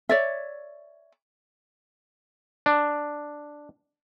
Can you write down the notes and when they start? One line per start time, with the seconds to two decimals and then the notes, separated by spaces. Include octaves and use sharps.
0.09 C#5 D5 E5
2.66 D4